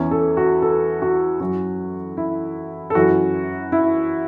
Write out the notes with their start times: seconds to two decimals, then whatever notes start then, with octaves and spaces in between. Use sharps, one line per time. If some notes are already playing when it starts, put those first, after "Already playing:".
Already playing: E2 E3 C#4 E4
0.11 A4
0.37 F#4
0.62 A4
1.02 F#4
1.40 F#2 F#3 C#4 E4 F#4
2.17 E4
2.90 A4
2.95 F#2 E3 C#4 E4 F#4
3.72 E4